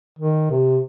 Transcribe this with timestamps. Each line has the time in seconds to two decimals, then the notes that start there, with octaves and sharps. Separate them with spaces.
0.19 D#3
0.51 C3